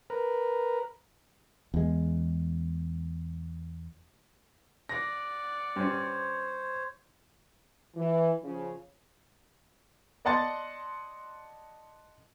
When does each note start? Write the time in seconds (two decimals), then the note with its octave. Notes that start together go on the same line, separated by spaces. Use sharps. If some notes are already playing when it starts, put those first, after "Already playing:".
0.10 A#4 B4
1.74 E2 G#3
4.89 D5 F#5 A#6
5.76 G2 C#4 C5 C#5
7.96 E3
8.42 C#3 F3
10.25 D5 D#5 F#5 A5 C6 A6